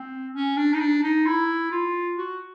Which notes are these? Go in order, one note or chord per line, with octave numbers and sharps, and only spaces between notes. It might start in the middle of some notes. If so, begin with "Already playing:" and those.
Already playing: C4
C#4
D4
D#4
D4
D#4
E4
F4
F#4